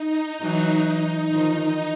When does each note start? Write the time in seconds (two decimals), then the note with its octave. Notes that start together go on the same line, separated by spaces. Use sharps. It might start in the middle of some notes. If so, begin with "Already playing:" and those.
Already playing: D#4
0.42 E3 F#3
1.32 D#3 F3